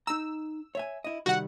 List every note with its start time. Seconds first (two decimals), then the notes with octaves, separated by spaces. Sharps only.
0.07 D#4 A#5 E6
0.75 C#5 E5 G#5
1.04 E4 D#5
1.26 C3 D#3 G3 F#4 F#5